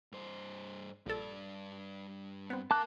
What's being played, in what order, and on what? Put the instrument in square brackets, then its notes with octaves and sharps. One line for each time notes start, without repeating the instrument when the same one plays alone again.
[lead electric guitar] G2 C5
[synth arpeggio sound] A#1 A4 [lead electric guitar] G2 D5
[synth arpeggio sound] B3 C4
[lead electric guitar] A#4 F5 [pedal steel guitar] A5 D6 F#6